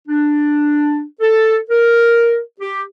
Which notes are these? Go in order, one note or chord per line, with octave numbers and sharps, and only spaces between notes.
D4
A4
A#4
G4